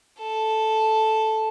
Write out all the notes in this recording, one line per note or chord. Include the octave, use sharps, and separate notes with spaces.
A4